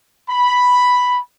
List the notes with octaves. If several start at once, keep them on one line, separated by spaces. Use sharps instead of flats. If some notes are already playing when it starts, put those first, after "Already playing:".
B5